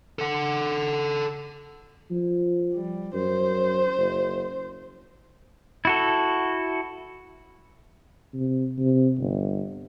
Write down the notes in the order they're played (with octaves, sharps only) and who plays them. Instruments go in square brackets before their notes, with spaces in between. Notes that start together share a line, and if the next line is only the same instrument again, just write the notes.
[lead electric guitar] A4 F#5
[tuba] F3
[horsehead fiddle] G3
[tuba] F#2 [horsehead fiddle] C5
[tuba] F#1
[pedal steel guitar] E4 F#4 A4
[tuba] C3
C3
G1